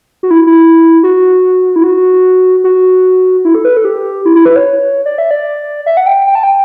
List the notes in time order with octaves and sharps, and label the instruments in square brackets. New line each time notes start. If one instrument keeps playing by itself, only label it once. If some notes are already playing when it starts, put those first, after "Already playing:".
[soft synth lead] F#4
E4
E4
F#4
E4
F#4
F#4
E4
A4
B4
A4
G4
E4
E4
B4
C#5
D5
E5
D5
E5
F#5
G5
G5
A5
G5